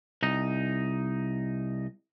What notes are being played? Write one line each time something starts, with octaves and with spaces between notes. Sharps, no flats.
C2 D#4